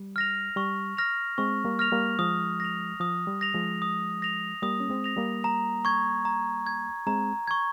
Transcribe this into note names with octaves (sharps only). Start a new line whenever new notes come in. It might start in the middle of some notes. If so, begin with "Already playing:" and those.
Already playing: G3
F6 A#6 F7
G3 C#6
F6 A#6 F7
G#3 C4 C#6
G3 A#3
F6 A#6 F7
G3 A#3
F3 G#3 D#6
A#6 F7
F3 D#6
G3
A#6 F7
F3 G#3
D#6
A#6 F7
G3 A#3 D#6
C#4
G#3 C4
A#6 F7
G3 A#3
A#5
C#6 G#6
A#5
C#6 G#6
G#3 C4 A#5
C#6 G#6